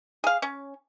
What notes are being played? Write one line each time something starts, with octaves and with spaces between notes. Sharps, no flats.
G#4 F5
C#4